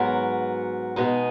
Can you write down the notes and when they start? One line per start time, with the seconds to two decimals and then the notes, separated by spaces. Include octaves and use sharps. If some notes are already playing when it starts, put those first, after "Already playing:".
Already playing: G#2 F#3 B3 F#4 A#4
0.96 B2 G#3 D#4 G#4